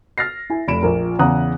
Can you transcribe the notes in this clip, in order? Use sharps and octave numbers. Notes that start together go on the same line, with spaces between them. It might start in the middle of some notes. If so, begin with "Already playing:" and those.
F6 A6 A#6 C7
E4 G#5
F1 B5 D7 E7
A#1 A#2 A#4
E2 C#3 F#5 A#5 D#6 F#6